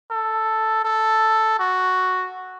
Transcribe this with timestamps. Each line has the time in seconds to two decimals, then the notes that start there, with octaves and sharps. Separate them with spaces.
0.11 A4
0.85 A4
1.59 F#4